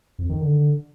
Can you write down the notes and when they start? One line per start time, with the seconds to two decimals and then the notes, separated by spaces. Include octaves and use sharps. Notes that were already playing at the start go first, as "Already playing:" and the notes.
0.19 F2
0.29 D#3
0.40 D3